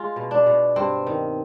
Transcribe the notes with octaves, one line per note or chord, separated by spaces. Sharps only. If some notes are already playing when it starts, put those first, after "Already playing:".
Already playing: G#3 F4
B2
D4
B2
G2 C4
D#3